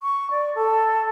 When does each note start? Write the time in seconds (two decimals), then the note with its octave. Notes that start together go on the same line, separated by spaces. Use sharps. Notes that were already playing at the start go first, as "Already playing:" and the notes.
0.02 C#6
0.31 D5
0.55 A4